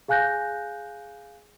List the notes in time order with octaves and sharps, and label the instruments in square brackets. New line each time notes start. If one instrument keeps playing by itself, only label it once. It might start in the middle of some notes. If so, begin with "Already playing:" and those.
[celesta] G#4 F5 G#5 F#6 G6 A#6